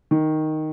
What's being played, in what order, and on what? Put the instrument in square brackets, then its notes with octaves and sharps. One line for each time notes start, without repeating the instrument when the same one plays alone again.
[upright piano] D#3